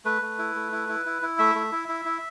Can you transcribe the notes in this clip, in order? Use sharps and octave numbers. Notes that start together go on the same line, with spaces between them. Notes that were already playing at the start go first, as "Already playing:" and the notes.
A3 B4
A3
E4
A3
E4
E4
E4
E4
A3 E5
A3
E4
E4
E4